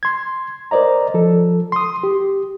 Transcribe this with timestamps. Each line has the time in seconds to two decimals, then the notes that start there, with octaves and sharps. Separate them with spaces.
0.03 C6 G#6
0.71 A#4 C5 D5 D#5 A#5
1.14 F3 A4
1.72 C6 D#6
2.03 G4